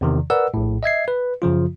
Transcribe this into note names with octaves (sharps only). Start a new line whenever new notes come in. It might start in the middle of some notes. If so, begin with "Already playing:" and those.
E2 C3 D#3
A#4 B4 D5 F#5 E6
A#1 A2
D#5 E5 G#6 C7
B4
F#2 C#3 F3 F4